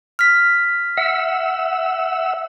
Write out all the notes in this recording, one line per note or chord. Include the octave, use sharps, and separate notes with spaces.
F6 B6
E5 F#5 E6